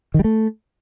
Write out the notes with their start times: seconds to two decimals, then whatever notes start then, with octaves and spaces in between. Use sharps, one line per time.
0.14 D#3
0.19 G3
0.24 A3